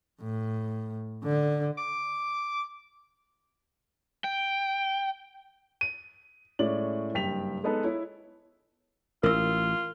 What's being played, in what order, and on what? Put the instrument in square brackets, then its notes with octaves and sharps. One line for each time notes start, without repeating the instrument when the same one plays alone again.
[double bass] A2
D3
[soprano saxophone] D6
[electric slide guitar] G5
[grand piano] D#7
A2 G#3 C#4 D5 F#7
F#1 G2 G5 B6 F7
G#3 B3 D#4 A4 B4
E4 C#5
[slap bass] A1 [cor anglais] F4 [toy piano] A#4 E6